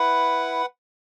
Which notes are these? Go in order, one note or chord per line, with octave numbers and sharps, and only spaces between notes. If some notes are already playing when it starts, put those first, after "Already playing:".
Already playing: E4 B4 F#5